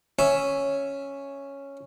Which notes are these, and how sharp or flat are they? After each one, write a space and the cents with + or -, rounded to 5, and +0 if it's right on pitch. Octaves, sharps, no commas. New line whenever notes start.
C#4 +0 E5 +0